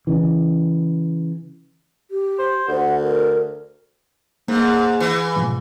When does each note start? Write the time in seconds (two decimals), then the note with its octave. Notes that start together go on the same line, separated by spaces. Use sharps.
0.07 C#3 E3
2.11 G4
2.38 C5
2.68 D2 F#5
3.02 A#4
4.48 G#2 A#3
5.00 E3
5.36 G#2 B2 F3